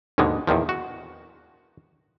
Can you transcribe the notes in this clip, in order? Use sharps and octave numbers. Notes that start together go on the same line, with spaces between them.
D#2 G#2 B2 D3 G#3
E2 A#2 D#3 F3
F#4